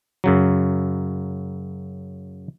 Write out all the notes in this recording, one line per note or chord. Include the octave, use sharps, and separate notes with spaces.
F#2 C#3 F#3